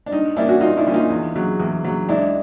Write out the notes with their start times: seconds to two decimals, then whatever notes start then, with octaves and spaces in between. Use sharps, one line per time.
0.06 D4
0.11 G2 D#4
0.36 E3 G3 A#3 C#4 D4 E4
0.49 F#4
0.61 G2 D#4 F4
0.77 D4 E4
0.86 E3 G3 A#3 C#4
0.94 D#4 F4
1.10 E2
1.35 C#3 F#3
1.60 E2
1.84 C#3 F#3
2.09 C#2 D4 E4